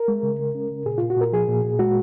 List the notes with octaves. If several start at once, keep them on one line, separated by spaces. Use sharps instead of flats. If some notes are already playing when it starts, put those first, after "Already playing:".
Already playing: A#4
G#3
C#3
G#3
C#4
C#3
A#2 G#4
A#2 F4
F#4
A#2 A#4
F3 G#4
A#2
A#2
G#3 F#4